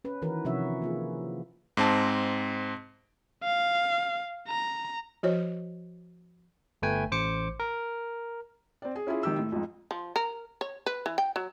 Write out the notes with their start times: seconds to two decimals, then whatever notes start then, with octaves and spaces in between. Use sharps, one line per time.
0.05 C#4 B4
0.22 D#3 E3 F#4 A#4 B4
0.45 C3 F3 C#4 F#4 C#5 E5
0.82 A#3 F4 G#4
1.77 G#2 C4 A5
3.43 F5
4.48 A#5
5.23 F3 F#4 C5 C#5
6.82 G1 A3 B4 G5 G#5
7.12 A1 C5 D6 C#7
7.60 A#4
8.82 C4 D5
8.96 G#4
9.07 C#4 E4 F4 G#4
9.23 G#1 D#3 G4 E6
9.38 A2
9.52 F2 G#2
9.91 F3
10.16 A#4
10.61 C#5
10.86 B4
11.06 E3
11.18 G5
11.36 F#3